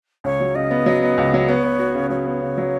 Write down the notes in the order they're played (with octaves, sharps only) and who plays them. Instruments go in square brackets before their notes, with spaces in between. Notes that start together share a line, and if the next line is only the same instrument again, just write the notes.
[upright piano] C#2 [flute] C#5
[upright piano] F#3
[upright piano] C#3 [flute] D#5
[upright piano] B3
F#3
B3
C#2
F#3
[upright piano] B3 [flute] C#5
[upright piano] B3
F#4
C#3
[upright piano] F#3 [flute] C#5
[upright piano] B3
C#3
F#3